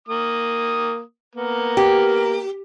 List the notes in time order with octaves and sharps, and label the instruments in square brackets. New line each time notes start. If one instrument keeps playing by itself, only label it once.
[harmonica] A#3 D#6
A#3 B3 A#4
[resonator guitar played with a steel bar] G4